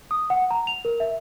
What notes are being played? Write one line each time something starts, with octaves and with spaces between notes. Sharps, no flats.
D#6
F#5
A#5
F7
A#4
E5